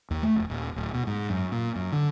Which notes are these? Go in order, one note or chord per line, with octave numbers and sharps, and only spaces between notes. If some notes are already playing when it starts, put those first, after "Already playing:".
D#2
A3
F1
D#1
D1
B2
G#2
F#2
A#2
F#2
D3